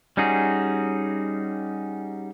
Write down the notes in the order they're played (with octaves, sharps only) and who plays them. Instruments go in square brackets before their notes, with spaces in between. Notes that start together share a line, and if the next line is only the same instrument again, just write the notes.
[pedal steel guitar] G3 C#4 D#4 F#4 G#4